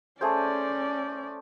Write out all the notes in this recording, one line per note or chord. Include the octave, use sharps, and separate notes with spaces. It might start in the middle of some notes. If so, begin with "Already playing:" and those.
A3 C#4 G#4 C5 D5